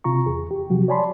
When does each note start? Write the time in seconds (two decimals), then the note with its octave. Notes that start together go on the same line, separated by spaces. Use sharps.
0.04 C3 F4 A#5 C#6
0.26 E2 G#4
0.51 G4
0.70 C3 F3 F#3 F#4
0.88 C#5 D5 G#5 A5 B5 C6